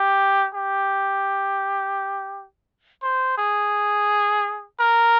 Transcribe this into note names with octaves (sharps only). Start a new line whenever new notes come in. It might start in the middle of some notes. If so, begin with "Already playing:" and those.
Already playing: G4
G4
C5
G#4
A#4